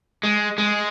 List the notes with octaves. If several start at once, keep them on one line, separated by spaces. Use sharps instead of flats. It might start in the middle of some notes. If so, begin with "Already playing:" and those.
G#3
G#3